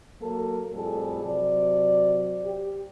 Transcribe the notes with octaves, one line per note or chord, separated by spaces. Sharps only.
F#3 A#3 A4 A#4
F2 A2 G3 G#4 A4
C3 F#3 D5
G4